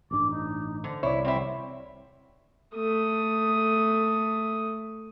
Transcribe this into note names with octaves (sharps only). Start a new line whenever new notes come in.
A1 G2 D4 D6
D#4
D3 C5
C2 E4 C#5 D5
C4 E4 F#5
A3 D#6